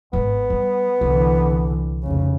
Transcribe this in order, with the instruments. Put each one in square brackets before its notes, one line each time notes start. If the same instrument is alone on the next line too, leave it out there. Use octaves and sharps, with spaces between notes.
[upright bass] G#1 G#2 [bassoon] B3
[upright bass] G3
[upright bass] C2 [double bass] D3 E3
[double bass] F1 C#3